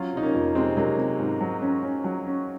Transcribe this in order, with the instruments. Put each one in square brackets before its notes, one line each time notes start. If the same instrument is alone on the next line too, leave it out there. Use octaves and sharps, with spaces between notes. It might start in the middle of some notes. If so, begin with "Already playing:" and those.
Already playing: [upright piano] F#3 [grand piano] C#4 F4
[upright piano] C3 [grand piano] D#4
[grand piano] A#3 C#4
[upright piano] F2
[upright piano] C3 [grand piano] G#3 C4
[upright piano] C3 [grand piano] F#3 A#3
[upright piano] C3
G#2
F#3
C#4
C#4
F#3
C#4